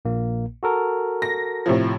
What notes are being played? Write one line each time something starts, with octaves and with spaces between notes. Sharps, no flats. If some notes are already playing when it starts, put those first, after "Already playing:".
A#1 A#2 A#3
F#4 A4 A#4
A#6
A2 C3 F3